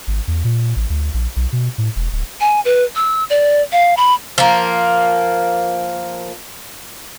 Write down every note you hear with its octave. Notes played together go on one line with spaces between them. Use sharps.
G#1
E2
A#2
A1
D2
A#1
B1
B2
A2
E1
D1
G#5
B4
E6
D5
F5
B5
F3 A#3